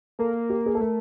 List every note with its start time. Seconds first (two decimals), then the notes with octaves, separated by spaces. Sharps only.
0.19 A#3 A4
0.50 G4
0.66 G#4
0.75 A4
0.81 A3 A#4